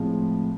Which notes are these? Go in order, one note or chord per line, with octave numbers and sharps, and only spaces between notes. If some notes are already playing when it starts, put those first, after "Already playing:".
Already playing: A2 F3 G#3 C4